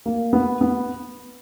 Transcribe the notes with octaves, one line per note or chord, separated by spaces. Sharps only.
A#3
B3
B3